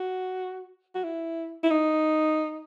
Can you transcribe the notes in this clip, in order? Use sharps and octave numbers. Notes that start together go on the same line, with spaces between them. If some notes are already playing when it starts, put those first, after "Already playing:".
Already playing: F#4
F#4
E4
E4
D#4